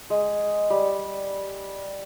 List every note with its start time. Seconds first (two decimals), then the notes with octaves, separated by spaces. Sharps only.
0.10 G#3
0.70 G3